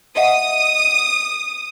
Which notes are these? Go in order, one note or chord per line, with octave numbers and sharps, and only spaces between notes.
D#5 E5 F#5 D#6